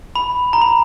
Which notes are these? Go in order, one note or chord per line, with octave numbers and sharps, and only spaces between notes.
B5
A#5
B5